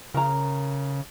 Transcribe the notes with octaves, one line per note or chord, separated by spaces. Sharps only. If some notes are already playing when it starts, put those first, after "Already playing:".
C#3 A#4 A#5